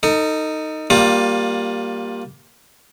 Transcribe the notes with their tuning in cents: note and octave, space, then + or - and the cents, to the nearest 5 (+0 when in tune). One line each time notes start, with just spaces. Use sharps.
D#4 +0 A4 +35
G3 +0 A#3 +0 F4 +25